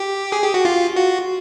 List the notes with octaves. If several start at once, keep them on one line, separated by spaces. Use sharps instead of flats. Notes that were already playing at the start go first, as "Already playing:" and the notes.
Already playing: G4
G#4
G4
F#4
F4
F#4